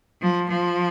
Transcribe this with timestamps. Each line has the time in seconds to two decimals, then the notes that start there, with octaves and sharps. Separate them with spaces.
0.21 F3
0.49 F3